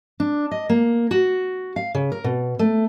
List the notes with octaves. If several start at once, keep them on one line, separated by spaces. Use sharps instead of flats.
D4
D#5
A#3
F#4
F5
C#3
A#4
B2
A3